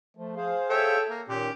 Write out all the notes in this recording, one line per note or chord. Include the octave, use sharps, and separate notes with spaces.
F3 A3
G#4 C5 F5
A4 C#5 E5 G5
A#3
A#2 D#3 C#4 G4